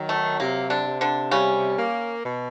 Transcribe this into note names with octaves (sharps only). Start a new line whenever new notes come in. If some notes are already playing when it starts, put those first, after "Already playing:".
Already playing: D#3 F#3
A3
C3 A#3
D3 D4
C3
D3 D4
C#3 G3 C#4
A#3
B2